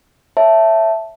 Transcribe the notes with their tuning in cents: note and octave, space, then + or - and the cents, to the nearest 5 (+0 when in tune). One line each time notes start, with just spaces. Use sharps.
C#5 +0 E5 +0 A5 +0